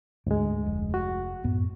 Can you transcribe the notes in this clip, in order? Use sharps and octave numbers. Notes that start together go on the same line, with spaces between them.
D2 G#2 G#3
F1
F#4
F#2 A2 B3